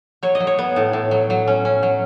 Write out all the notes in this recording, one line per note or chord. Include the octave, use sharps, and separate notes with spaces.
F#3 C#5
D#5
F#3
C#5
B3
A2
A2
F#3
F#3
C#4
C#4
F#3